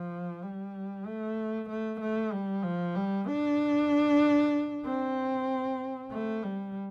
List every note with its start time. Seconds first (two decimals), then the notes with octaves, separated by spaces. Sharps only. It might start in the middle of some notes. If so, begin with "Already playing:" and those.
Already playing: F3
0.42 G3
1.06 A3
1.69 A3
2.01 A3
2.32 G3
2.63 F3
2.95 G3
3.27 D4
4.86 C4
6.11 A3
6.43 G3